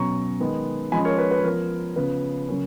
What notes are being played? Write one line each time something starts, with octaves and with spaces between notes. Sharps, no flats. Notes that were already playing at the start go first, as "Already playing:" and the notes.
Already playing: B2 F#3 C#4 A#5 C#6
D#3 G#3 B3
F3 G#3 C#4 G#5 B5
A#4 C#5
B4
B4
F3 B3 A#4
C#3 F3 B3 B4
C#3 F#3 A#3 C#4